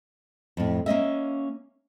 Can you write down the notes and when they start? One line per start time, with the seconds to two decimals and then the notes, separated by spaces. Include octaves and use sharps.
0.57 F2 A2
0.86 A#3 C#4 D#5 E5